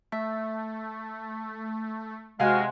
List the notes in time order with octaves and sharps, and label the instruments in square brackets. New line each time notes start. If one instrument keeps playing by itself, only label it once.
[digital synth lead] A3 [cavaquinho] E5
[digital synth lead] C3 [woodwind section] G#3 [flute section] F#4 F6 [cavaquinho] F5 F#5 G#5